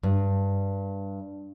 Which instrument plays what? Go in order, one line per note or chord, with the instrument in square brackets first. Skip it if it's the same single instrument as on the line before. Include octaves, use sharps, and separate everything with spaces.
[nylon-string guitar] G2